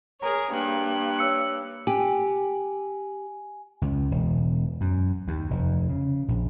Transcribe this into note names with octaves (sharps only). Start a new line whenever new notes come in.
G#4 A#4 C#5 A#5
G2 A#3 F#6
C#5 E6 C#7
G4 G#5
C#2
E1
F#2
D#2
F1
C#3
A#1